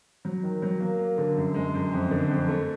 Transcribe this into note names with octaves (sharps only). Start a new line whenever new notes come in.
F#3
D#3
F#3
A#3
A#3
D3
F#2
G#3
F#2
F2
D3
F2
A3